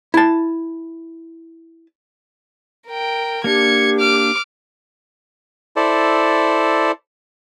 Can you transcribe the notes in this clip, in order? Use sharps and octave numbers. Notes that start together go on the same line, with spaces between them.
E4 A5
A#4 G5
A#3 D4 G4 G#6 C#7
D6 F6
E4 A4 C5 D5